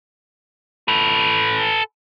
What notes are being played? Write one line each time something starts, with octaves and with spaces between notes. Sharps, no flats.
A4 B4